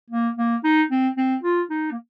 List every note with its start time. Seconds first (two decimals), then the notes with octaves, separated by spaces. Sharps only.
0.11 A#3
0.37 A#3
0.64 D#4
0.90 C4
1.17 C4
1.43 F4
1.70 D#4
1.92 A#3